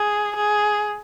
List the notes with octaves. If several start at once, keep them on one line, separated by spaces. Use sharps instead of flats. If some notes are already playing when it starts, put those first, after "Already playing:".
Already playing: G#4
G#4